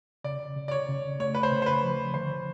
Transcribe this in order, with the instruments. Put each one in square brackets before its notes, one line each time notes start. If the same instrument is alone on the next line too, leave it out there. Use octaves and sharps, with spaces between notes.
[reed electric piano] C#3 [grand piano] D5
[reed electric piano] C#3
[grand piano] D5
C#5
[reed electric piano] C#3
[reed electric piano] A3 [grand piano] C#5
[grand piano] B4
C5
[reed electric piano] C#3
[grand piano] C5
B4
[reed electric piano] F3
[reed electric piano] D3 [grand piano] C5